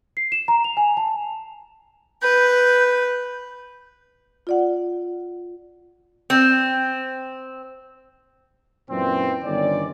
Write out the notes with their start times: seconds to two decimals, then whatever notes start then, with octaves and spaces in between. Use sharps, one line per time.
0.17 C7
0.32 E7
0.48 A#5
0.64 F7
0.77 G#5
0.97 A5
2.22 B4 G6
4.47 F4 D5 F#5
6.30 C4
8.90 F#2 A#2 E3 C4
9.44 G1 D#3 C#4 D5